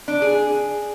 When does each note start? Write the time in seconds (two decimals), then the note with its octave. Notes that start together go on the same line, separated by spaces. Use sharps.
0.08 D4
0.22 G#4